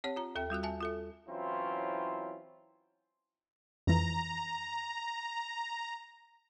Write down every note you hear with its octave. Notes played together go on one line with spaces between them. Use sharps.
C4 G4 C#5 F#5
F4 A#5
D#2 A4 E5 G5
G3 F4 F#4 F#6
E5 G#5 A5
F4 A4 E5
E3 F#3 C4 C#4 E4 F4
F2 E3 A#5